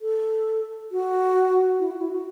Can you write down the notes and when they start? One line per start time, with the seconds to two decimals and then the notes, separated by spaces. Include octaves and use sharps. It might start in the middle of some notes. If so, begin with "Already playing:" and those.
0.02 A4
0.92 F#4
1.80 E4
1.91 F#4
2.01 E4
2.13 F#4